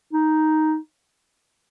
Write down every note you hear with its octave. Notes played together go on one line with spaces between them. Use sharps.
D#4